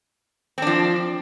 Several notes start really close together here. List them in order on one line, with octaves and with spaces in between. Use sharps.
C4 D4 F3